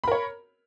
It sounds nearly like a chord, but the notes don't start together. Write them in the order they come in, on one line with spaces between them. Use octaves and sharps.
B5 A#4 C#5